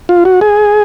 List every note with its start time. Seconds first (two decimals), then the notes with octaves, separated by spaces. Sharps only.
0.09 F4
0.25 F#4
0.41 G#4